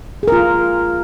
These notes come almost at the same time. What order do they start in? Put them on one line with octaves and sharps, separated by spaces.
G#4 A#4 F4